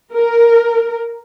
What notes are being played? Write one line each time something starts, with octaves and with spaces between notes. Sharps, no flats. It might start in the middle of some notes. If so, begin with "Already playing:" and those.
A#4